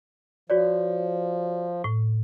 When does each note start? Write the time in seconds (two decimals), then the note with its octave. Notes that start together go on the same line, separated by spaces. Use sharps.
0.50 F3 F#4 C#5 D5
1.84 A2